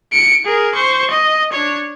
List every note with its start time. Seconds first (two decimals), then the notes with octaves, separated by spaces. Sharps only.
0.13 C#7 D7
0.45 G#4 A#4
0.75 C5 C#6
1.10 D#5
1.53 D4 C#5